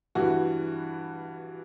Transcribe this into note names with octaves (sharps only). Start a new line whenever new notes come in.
G2 E3 G3 F#4